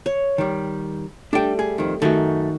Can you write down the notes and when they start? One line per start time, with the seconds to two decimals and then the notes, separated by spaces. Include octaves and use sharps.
0.06 C#5
0.38 D#3 G3
1.33 G3 A3 D4 G5
1.59 G#4
1.78 F2 D#3
2.02 F#2 D#3 A3 F#4